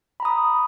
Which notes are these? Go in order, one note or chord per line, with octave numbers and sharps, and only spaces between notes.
A#5 B5 D#6